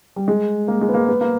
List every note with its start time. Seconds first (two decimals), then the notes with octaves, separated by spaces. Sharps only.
0.16 G3
0.28 G#3
0.68 A#3
0.81 G#3
0.89 B3
0.94 A#3
1.08 B3
1.21 A#3